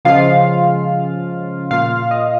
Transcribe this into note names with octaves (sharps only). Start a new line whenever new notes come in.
C#3 F3 G#3 F4 F5
A#2 A#3 F4 F5
D#5